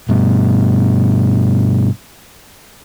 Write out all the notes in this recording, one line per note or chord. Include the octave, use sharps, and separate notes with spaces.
G2 B2